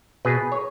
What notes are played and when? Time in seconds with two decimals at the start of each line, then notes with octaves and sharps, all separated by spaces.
0.25 B2 G#4 B4
0.52 C#5